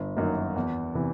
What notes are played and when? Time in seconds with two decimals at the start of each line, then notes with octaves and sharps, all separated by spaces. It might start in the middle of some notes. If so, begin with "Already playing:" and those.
Already playing: G1
0.17 F#2 D#3 F#3 A#3
0.56 E2
0.94 C3 E3